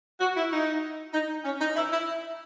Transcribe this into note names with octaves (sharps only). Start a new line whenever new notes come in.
F#4
E4
D#4
D#4
C#4
D#4
E4
E4